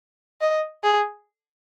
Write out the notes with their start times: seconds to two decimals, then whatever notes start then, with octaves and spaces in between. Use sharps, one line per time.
0.41 D#5
0.83 G#4